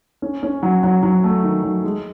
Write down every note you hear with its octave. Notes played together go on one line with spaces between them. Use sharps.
C#4
C#4
F#3
F#3
F#3
A3
D#3
F#3
G#3